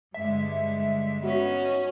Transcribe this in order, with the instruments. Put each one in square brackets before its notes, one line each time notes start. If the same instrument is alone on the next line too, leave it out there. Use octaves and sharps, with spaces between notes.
[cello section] G2 D3 G#3 [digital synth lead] E5
[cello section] B3 D#4 [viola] C#4 [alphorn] F#4